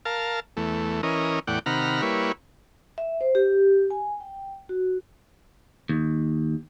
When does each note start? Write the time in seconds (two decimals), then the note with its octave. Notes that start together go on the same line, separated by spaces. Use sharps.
0.05 A#4 F5 A5
0.57 E2 A3
1.03 E3 C#4 A#4 D#5
1.47 E2 A2 D5 F#5 G5
1.66 C3 D#3 F#5 A#5 B5 F6
2.02 G3 A#3 E4 B4 C#5
2.98 E5
3.21 C5
3.35 G4
3.90 G#5
4.20 G5
4.69 F#4
5.89 D#2